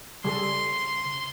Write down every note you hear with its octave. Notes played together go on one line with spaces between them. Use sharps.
C#3 G3 G#4 A4 C6